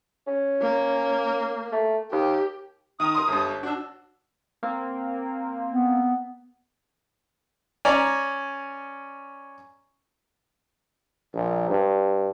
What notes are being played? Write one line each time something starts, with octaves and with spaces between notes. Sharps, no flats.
C#4
A#3
A3
D#2 G4
D#3 A#5 D#6
A#4 C6
G1 G2
D4 F#4 E6
A#3 C4
B3
C#4 D5 G#5 A#5
A#1
G2